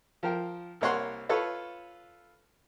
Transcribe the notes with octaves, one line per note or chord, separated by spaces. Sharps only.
F3 A#4 G5
C2 A#3 C#5 F#5 C6
F4 A4 B4 C#5